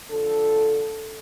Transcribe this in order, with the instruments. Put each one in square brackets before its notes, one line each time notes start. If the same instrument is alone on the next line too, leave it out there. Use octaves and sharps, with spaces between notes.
[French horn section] D3 F3 A4